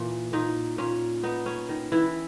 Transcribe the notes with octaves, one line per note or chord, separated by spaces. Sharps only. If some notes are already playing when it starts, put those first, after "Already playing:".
Already playing: A#2 E3
A#2 D#4
A#2 C#4
B3 D#4
C#4
D#3
E3 E4